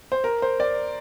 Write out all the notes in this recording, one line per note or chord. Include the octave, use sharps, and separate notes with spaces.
C5
A#4
C5
D5